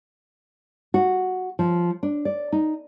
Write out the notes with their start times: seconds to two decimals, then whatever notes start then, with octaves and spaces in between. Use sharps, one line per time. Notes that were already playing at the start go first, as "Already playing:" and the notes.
0.94 F#4
1.59 F3
2.03 D4
2.25 D5
2.52 D#4